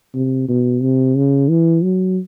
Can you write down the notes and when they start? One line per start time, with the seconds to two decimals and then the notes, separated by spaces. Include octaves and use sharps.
0.15 C3
0.48 B2
0.82 C3
1.16 C#3
1.49 E3
1.83 F#3